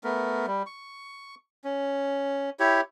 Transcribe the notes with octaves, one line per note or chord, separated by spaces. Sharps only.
A3 B3 A#4
G3
C#6
C#4
E4 G4 C#5